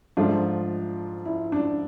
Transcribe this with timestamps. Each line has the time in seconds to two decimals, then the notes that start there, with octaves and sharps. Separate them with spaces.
0.17 G#2 F3 A3 D4 F4
1.25 E4
1.52 D4